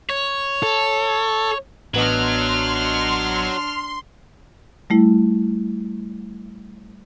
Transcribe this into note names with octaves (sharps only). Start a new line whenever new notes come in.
C#5
A4
A1 F#3 B3 D4 D#5 C6 F6
G3 A3 E4